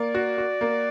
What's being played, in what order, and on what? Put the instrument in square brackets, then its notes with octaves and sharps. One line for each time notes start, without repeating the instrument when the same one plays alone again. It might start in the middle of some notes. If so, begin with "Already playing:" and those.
Already playing: [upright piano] A#3 [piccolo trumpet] D5
[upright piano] F#4
F#4
A#3